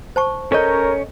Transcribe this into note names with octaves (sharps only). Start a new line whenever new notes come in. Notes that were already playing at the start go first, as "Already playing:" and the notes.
C5 A5 C#6
C#4 A4 A#4 C#5 D#5 G6